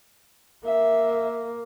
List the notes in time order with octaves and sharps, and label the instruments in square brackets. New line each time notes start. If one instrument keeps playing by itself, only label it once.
[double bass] A#3 [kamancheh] E5